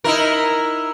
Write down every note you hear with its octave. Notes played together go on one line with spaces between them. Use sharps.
D#4 E4 A#4